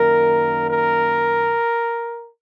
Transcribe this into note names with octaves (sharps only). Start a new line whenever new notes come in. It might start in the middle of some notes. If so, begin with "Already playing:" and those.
Already playing: F#2 D#3 A#3 A#4
A#4